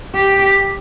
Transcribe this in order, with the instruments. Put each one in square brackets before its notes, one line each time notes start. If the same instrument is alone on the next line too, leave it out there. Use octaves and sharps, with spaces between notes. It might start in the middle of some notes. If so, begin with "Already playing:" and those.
[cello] G4